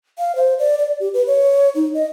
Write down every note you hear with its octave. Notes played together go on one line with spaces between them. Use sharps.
F5
C5
D5
D5
G4
B4
C#5
D#4
D#5